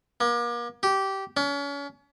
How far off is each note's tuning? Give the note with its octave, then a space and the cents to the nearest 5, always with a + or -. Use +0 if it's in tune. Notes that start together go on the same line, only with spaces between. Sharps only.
A#3 +40
G4 -15
C#4 +35